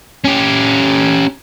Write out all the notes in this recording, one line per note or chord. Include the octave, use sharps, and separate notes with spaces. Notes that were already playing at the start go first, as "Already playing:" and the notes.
C#4 G4